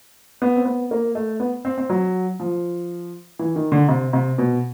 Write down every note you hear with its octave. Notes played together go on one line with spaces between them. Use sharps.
B3
C4
B3
A#3
A3
B3
C4
C4
F#3
F3
E3
D#3
D3
C3
C3
B2